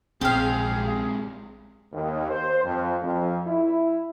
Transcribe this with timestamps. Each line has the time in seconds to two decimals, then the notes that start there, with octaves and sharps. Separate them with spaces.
0.21 A#1 C3 G#3 C4 G4 G#4 F5
1.92 D#2
2.30 C5
2.64 F2
3.02 F2
3.47 E4